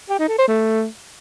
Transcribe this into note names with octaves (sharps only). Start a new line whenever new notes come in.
G4
D#4
A4
C5
A3